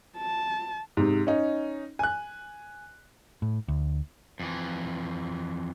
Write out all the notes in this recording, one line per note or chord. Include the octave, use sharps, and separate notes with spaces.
A5
G#2 C3
C#4 D#4
G#5 F#6
A2
D2
F2 E3